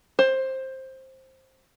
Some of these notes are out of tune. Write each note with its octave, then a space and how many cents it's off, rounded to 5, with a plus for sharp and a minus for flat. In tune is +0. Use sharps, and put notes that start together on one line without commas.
C5 +15